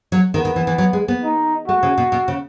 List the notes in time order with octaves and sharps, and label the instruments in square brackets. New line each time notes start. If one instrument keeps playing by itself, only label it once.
[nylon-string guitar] F#3
[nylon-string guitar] D#3 [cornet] B3
[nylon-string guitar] D#3
E3
E3
F#3
G#3
B3
[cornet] D#4
[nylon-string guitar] A3 [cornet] F#4
[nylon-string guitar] C#3
B2
B2
C#3